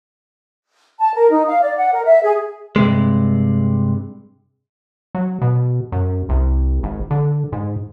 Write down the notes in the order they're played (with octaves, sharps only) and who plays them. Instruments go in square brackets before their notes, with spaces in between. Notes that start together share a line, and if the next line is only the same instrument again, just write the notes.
[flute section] A5
A#4
D#4
F5
D5
F#5
A#4
E5
G#4
[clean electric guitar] G2 C3 G#3
[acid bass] F#3
B2
F#2
C2
G#1
D3
G#2